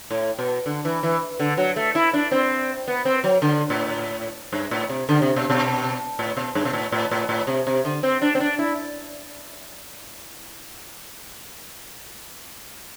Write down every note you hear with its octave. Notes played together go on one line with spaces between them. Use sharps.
A2
B2
D3
E3
E3
D3
F#3
A3
E4
D4
C4
B3
C4
F#3
D3
A2
G2
A2
C3
D3
C3
B2
B2
A2
B2
G2
B2
A2
A2
A2
A2
C3
C3
D3
C4
D4
C4
D4
E4